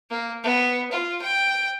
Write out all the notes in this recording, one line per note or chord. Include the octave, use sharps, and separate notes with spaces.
A#3
B3
F4
G5